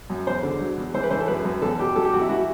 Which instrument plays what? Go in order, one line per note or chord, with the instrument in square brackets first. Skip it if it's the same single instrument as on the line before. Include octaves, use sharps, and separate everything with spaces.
[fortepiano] F#2
E2 C5
D3
F#3
E2
E3 C5
B4
E3 C5
A4
F#2 B4
F#2
E2 A4
B2 G4
F#3 A4
G4
E2 F#4
E4
E3 F#4